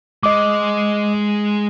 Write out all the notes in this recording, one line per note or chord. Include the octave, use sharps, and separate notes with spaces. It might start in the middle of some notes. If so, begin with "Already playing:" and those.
G#3 D#5 D6